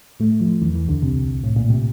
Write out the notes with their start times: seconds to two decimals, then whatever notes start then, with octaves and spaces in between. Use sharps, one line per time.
0.20 A2 A3
0.40 F2 F3
0.62 E2 E3
0.75 E2 E3
0.88 D2 D3
1.02 C2 C3
1.44 A2
1.56 A#2
1.70 C3